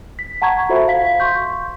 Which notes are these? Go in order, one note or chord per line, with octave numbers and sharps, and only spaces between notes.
B6
F#5 A5 A#5 C#6 G#6
F4 F#4 A4 C5 E5 B5
F5 B6
C6 C#6 G6